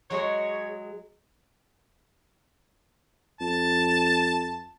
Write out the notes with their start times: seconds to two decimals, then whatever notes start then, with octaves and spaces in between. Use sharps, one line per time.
0.10 F#3 G#3 G#4 C#5
3.40 F2 A5